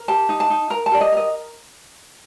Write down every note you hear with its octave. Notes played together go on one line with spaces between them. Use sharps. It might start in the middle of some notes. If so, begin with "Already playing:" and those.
Already playing: A#4
G4 A5
D#4
A5
D#4
A#4 A#5
A5
G4 D5
D#5
A#4 D#5